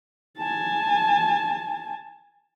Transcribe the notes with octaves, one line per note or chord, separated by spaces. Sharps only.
G#5 A5